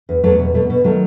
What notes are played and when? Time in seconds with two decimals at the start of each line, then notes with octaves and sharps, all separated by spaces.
0.09 E2
0.24 E2 F#3 A3
0.39 B2
0.54 B2 F#3 A3
0.70 B2
0.84 D#3 F#3 A3